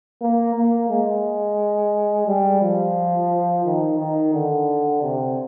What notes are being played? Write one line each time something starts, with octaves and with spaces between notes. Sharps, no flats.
A#3
A#3
G#3
G3
F3
D#3
D#3
D3
C3